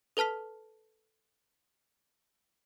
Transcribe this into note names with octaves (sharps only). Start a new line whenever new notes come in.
A4 B4 A5 F6 B6